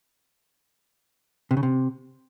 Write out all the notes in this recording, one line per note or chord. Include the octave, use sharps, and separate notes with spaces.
C3
C#3
C3